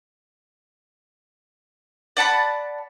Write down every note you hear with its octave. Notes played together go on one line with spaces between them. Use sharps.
D5 F#5 A5 B5